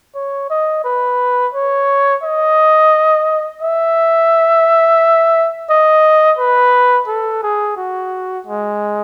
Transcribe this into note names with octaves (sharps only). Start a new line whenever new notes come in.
C#5
D#5
B4
C#5
D#5
E5
D#5
B4
A4
G#4
F#4
G#3